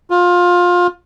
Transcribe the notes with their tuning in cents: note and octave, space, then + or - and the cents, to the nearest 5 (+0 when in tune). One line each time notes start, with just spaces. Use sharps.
F4 +20